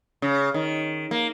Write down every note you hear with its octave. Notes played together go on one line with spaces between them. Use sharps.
C#3
D#3
A#3